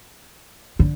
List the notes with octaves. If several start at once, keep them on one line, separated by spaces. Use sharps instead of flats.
D3